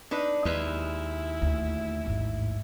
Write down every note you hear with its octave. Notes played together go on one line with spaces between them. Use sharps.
D4 D#4 B4
D#2 G#3 E4 B4
D2
A1 G#2